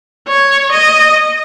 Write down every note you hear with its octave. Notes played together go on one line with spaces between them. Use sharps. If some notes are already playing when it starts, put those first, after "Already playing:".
C#5
D#5